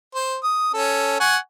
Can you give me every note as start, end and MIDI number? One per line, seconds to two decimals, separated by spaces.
0.14 0.37 72
0.44 0.71 87
0.73 1.16 61
0.73 1.16 69
1.20 1.37 78
1.20 1.37 80
1.20 1.37 85